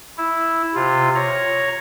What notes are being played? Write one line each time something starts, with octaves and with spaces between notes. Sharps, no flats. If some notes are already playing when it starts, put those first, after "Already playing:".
E4
C3 F4
C#5 A#5